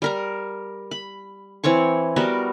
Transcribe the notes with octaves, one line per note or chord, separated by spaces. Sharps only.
G3 A#4 A#5
B5
E3 C4 C#5 C#6
G3 B3 F#4 A#4